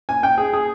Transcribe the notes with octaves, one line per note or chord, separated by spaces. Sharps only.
G#5
G5
G#4
G#4